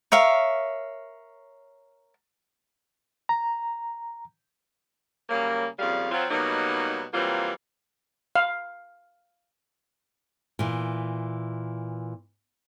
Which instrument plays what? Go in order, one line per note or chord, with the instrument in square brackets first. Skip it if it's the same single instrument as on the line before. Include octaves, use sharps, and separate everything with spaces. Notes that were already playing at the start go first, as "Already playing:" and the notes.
[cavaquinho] A#4 C#5 E5 F5
[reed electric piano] A#5
[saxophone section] C#3 F#3 G3 A#3
F2 A#2 C#3 G3 F5
F#3 C4 F4
B2 F#3 G3 A#3 D#4
E3 F#3 G3 A#3 C4 F4
[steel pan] F5
[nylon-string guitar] A#2 E3